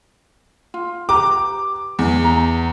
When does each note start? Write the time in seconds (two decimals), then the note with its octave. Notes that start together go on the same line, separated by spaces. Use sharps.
0.74 F4
1.09 G4 B4 A#5 D6
1.99 E2
2.24 A#5